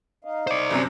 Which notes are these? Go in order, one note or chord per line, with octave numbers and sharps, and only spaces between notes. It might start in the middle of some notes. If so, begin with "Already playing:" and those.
D#4 D#5 F5
C5 D5
G1 F#2 C3